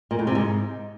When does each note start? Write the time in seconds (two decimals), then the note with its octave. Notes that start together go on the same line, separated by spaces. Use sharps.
0.11 A#2
0.19 A2
0.27 C3
0.35 G#2